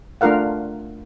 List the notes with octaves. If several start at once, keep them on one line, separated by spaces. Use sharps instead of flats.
A3 D4 F4 A#4 F5 F#5